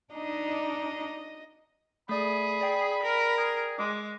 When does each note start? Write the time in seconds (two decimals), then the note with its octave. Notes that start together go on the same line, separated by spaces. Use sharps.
0.13 D4 D#4 D#5
2.09 A3 G#4 D5 B5
2.61 D5 G5
3.03 A#4
3.38 G#4
3.78 G#3 D6